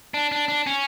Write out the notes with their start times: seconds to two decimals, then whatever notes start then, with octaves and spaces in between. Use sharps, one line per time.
0.14 D4
0.32 D4
0.48 D4
0.67 C#4